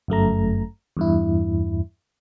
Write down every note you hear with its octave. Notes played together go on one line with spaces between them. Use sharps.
G1 F#2 A3 A#5
E2 G2 E4